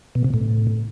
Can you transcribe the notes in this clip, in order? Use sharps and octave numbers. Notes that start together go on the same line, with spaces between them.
B2
C3
A2